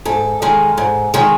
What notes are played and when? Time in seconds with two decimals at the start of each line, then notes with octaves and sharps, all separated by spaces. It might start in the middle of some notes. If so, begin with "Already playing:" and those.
0.05 G#2 A4
0.42 D#3 G#3
0.78 G#2
1.14 D#3 G#3